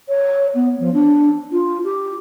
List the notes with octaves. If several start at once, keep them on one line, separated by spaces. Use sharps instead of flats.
C#5
B3
F3
D4
F4
G4